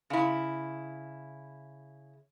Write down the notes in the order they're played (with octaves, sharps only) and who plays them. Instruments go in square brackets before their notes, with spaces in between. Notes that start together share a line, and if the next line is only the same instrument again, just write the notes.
[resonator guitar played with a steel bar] C#3 E4